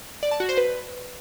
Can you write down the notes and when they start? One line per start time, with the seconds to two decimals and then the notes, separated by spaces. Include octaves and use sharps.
0.23 D5
0.31 A5
0.40 F#4
0.49 C5
0.57 B4